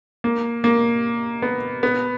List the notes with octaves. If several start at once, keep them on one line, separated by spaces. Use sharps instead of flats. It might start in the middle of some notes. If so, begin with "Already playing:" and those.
A#3
A#3
B3
B3